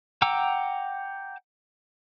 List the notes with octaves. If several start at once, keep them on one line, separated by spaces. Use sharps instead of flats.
F#5 G5 A#5 D6 E6